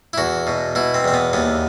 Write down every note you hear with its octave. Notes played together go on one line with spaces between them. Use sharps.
E4
E2 F#4
B2
B2 E4
C4
E2 C4
B3
D#2 B3